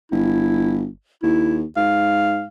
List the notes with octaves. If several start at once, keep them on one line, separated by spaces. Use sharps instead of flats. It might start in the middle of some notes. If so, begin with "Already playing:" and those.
G1 E4
D#2 E4
G#2 F5